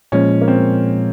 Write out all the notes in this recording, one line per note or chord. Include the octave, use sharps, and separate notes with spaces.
A#2 F3 G#3 C#4
A#3
C4